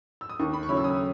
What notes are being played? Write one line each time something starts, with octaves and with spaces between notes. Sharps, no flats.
E6
D#6
D#2 C#6
B5
C#6
C#3 F#3 C#4 E4 B5
E6
D#6